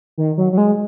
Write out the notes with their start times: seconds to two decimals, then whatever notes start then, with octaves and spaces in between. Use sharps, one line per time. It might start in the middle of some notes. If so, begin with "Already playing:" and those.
0.18 D#3
0.37 F#3
0.52 F#3
0.58 G#3